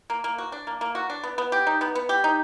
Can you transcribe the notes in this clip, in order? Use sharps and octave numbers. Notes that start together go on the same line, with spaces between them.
A#3
A#3
F#4
D4
A#3
A#3
F#4
D4
B3
B3
G4
D#4
B3
B3
G4
D#4